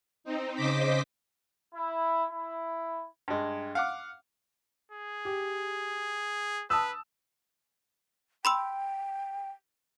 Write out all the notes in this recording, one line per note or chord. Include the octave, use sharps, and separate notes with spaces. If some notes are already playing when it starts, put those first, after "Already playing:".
C4 D#4
C#3 C5 D#5 D6 B6
E4
E4
G2 G#3
F5 F#5 D6
G#4
G4
B4 A5 D#6 E6
G5 B5 C6 E6